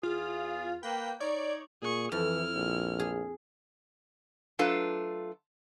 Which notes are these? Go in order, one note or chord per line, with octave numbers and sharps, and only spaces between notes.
E2 F4 G#4
A#3 B4 G5
D#4 C#5 D5
A#2 G#4 C#6
F2 E3 E4 F6
A#1
G#4
F#3 A3 D4 F4 A4 B4